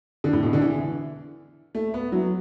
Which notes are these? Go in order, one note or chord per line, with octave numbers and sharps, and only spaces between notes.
D3
A2
B2
D3
E3
A3
B3
F#3